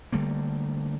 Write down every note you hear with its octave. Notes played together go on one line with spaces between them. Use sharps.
D3 G3 A3 A#3